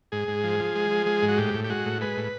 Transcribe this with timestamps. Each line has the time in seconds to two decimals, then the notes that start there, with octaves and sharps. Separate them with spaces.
0.12 G#2 G#4
0.28 G#2
0.44 F3
0.60 F3
0.75 G#3
0.91 F3
1.06 G#3
1.22 G#2
1.28 F#4
1.38 A2 G4
1.54 A2
1.64 G4
1.70 G#3 F#4
1.85 A2
2.01 G#3 B4
2.17 A2